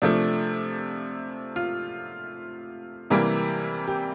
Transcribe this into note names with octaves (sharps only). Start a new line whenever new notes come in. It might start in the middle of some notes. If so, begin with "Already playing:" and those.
C3 F3 A3 D4
F4
C3 E3 G3 A#3
G4